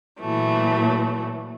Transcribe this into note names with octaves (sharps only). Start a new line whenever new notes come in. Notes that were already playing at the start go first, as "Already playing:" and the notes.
A#2 E3 F#3 A3